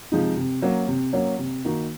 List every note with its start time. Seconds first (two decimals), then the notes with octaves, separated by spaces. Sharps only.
0.12 C3 F3 G#3 D#4
0.37 C3
0.62 F#3 A#3 C#4
0.88 C3
1.13 F#3 A#3 C#4
1.39 C3
1.65 D#3 A#3 D#4 F#4